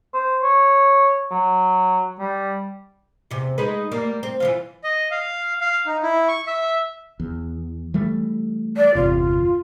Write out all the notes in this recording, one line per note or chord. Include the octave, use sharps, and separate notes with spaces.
C5
C#5
F#3
G3
E2 C3
G#3 D#4 B4
G3 A#3
C4
E3 F3 F4
D#5
F5
F5
D#4
E4
C#6
E5
E2
E3 G3 A3
D5
G1 E2 C3 F4